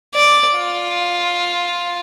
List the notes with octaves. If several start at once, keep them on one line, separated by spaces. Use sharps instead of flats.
D5
F4